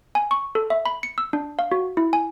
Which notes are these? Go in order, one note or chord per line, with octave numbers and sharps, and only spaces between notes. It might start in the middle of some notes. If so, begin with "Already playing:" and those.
G#5
C#6
A4
E5
B5
C#7
E6
D4
F5
F#4
E4
G#5